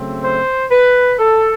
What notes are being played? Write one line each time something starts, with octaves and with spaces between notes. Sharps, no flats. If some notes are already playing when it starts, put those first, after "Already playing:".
Already playing: C#3 F#3 A3 C4
C5
B4
A4